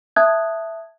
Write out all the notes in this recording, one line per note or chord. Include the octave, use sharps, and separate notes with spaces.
E5 A5 D#6 F#6 G#6